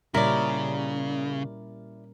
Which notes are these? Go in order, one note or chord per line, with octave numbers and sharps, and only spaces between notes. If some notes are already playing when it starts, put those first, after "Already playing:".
A#2 C#3 G3 C#4 E4 A#4 D5